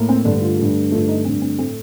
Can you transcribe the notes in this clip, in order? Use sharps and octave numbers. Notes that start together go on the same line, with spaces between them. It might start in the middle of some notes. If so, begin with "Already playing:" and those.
Already playing: A2 A#3
C4
G2 D3 A3 D4
F4
G2 D3 A3
G2 D3 A3 F4
D#4
G2 D3 A3 C4
C4
A2 A3 C4